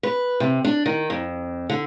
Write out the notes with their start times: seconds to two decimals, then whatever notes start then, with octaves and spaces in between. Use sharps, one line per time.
0.03 B4
0.40 C3
0.65 D4
0.86 D#3
1.10 F2
1.70 D3